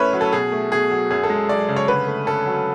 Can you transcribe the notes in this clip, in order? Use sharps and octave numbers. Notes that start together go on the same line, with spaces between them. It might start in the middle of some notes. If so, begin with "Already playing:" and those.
Already playing: A2 A3 C#4 B4 C#5 E5
F#3
A4
B2 G#4
A3
B2 G#4
F#3
F#2 G#4
A4
G#3
F#2 D5
C#3
C#5
D3 B4
A3
C#4 A4
F#3